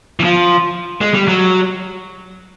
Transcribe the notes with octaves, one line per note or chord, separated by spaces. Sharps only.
E3
F3
G#3
G3
F#3